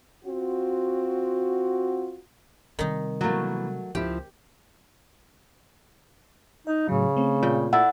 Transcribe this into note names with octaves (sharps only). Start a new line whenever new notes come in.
C4 F4 F#4
C3 D#3 G3 D#4
E3 F#3 A3 A#3
C#2 F3 E4 G4
D#4 D#5
A2 C#3 F#3
A3 C4
A#2 G5
E4 A4 D5 F#5